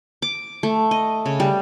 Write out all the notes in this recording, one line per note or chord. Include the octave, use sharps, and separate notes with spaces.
D6
A3
D#5
C#3
G3